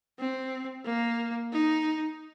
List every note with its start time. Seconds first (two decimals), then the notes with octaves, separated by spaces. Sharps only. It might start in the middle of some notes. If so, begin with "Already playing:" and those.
0.19 C4
0.85 A#3
1.52 D#4